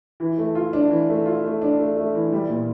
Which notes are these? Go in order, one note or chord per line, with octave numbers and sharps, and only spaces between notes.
E3
A3
F4
D4
E3
A3
F4
A3
D4
A3
A3
E3
G3
A#2